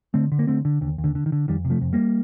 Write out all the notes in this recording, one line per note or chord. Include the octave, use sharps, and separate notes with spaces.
D3 A3 C4
D3
A#3
D3 A3 C4
D3
D#2 D3
D#2
D3
D3
D#3
D3
F2 D#3 G3
C3
F3 A3
F2
G3 A#3